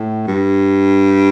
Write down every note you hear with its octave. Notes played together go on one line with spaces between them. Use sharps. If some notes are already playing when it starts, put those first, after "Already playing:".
Already playing: A2
G2